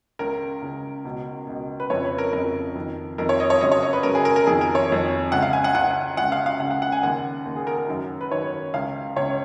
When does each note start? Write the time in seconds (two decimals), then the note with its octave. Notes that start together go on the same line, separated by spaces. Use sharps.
0.19 C#2 C#3 A#4
0.62 C#2 C#3
1.05 C#2 B2
1.47 C#2 B2
1.80 B4
1.90 F2 C#3 C#5
2.05 B4
2.18 A#4
2.33 F2 C#3 A#4
2.75 F2 D#3
3.18 F2 D#3 A#4
3.29 C#5
3.40 D#5
3.50 C#5
3.61 F#2 C#3 D#5
3.72 C#5
3.83 D#5
3.93 B4
4.03 F#2 C#3 A#4
4.15 G#4
4.25 A#4
4.36 A#4
4.47 F2 D#3 G#4
4.61 A#4
4.75 C#5
4.90 F2 D#3
5.32 C#2 C#3 F#5
5.42 F5
5.53 G#5
5.64 F#5
5.75 C#2 C#3 F#5
6.17 C#2 C#3 F#5
6.32 F5
6.46 F5
6.60 C#2 F#5
6.63 C#3
6.71 F#5
6.82 F#5
6.92 G#5
7.03 D#2 C#3 F#5
7.45 D#2 C#3
7.56 G#4
7.67 A#4
7.78 A#4
7.88 F#2 D#3
8.21 B4
8.31 F#2 D#3 C#5
8.74 C#2 C#3 F5
9.16 C#2 C#3 C#5